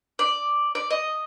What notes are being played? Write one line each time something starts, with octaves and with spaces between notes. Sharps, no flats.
D5
D5
D#5